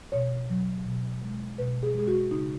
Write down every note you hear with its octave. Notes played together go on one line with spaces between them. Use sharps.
B2 C#5
F#3
B2
G#3
B2 B4
G#4
G#3 G#4
F#4
C#3 D#4